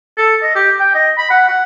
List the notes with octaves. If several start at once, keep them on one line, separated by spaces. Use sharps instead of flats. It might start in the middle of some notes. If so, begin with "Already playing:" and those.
A4
D#5
G4
G5
D#5
B5
F#5
F#5